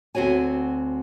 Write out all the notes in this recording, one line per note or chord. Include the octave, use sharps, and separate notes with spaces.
D2 C4 F#4 C#5 G#5